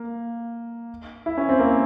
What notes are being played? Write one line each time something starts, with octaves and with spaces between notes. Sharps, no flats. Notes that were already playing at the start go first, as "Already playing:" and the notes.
Already playing: A#3
E4
C#4
C4
A#3